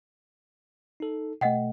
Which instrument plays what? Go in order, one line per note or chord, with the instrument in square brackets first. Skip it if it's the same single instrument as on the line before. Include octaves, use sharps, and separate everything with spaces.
[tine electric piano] D#4 A4
[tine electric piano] B2 A3 [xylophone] D#5 F#5 G5